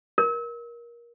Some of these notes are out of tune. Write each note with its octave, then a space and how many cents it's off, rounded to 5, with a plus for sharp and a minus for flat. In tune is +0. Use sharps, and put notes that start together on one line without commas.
A#4 +20